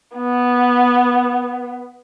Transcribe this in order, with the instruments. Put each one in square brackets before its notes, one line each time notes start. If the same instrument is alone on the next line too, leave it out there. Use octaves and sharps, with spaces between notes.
[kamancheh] B3